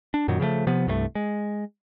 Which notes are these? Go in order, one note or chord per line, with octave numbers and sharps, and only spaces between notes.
D4
F#2 A#2 D#3 F#3
C#3 F3 G3 A3
C3 F3 B3
C2 G2 G3 A3
G#3